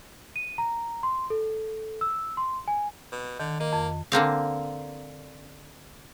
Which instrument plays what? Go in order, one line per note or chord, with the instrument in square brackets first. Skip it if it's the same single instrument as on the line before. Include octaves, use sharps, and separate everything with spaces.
[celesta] D#7
A#5
C6
A4
E6
C6
G#5
[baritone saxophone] B2
[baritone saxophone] D3 [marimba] D#3
[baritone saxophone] A#3 [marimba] D#5
[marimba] F2
[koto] D3 A#3 C4 F5